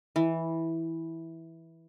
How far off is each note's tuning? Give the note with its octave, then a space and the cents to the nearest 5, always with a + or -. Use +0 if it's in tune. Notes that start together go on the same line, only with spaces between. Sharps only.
E3 -10